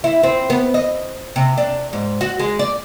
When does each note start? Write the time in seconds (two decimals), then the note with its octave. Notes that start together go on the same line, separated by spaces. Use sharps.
0.04 E4
0.23 C4
0.50 B3
0.74 D#5
1.36 C3
1.58 D4
1.93 G#2
2.21 F#4
2.39 G#3
2.59 D5